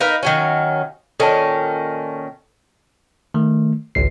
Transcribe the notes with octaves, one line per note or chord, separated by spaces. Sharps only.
D#4 A#4 B4 F5
D#3 F#3 C#4
A#2 D#3 C#4 A4 A5
D#3 A3
G#1 C#2 C7